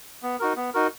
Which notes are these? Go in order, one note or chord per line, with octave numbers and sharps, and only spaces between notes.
B3
D#4 F#4 A#4
B3
D#4 F#4 A#4